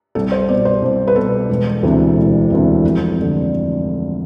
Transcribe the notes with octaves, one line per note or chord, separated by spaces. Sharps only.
C2 A4
C5
B2 D5
C5
C2
B4
B2 A4
E1
D2 C3 E3
E1
D2 C3 E3
F1
D3